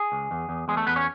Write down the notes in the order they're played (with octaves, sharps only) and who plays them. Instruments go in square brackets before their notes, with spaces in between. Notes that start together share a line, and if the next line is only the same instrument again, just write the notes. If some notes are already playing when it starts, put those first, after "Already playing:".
Already playing: [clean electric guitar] G#4
C#2
E2
E2
E2 G#3 G#4
A3 A4
E2 B3 B4
C#4 C#5